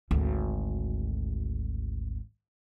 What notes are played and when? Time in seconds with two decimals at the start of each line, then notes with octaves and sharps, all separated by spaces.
0.11 G#1 D2